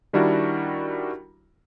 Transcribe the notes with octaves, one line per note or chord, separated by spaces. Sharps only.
D#3 G3 D4 E4 F#4 A#4